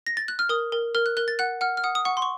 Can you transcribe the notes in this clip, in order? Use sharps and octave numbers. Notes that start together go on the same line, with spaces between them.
A#6
A6
F#6
F6
A#4 D#6
A#4
A#4 F6
F#6
A#4 F#6
A6
F#5 F#6
F#5 F6
F6
F#5 D#6
D#6
F#5 C#6
C6
C#6